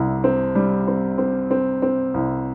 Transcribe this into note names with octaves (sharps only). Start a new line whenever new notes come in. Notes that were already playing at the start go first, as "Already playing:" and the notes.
Already playing: C2 C3 G3
C4
G3
C4
C4
C4
C4
C2